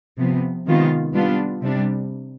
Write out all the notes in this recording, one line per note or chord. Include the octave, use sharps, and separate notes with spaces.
C3 F3 B3
C3 D#3 G#3 B3 F4
G3 B3 D4 F4
C3 G3 D4